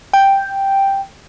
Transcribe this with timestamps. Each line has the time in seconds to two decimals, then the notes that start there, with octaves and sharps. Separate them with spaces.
0.13 G5